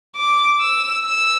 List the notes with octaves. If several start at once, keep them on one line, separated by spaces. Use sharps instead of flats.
D6
E6
E6